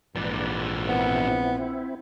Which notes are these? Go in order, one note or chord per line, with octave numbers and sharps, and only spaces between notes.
A#1 G#2 E3 B4 D5
B3 C4 E4